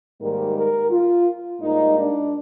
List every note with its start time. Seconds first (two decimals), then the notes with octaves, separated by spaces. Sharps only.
0.19 G#2 D#3 G3 A#3 A#4
0.55 A#4
0.90 F4
1.60 G#2 G3 A#3 D#4
1.96 D4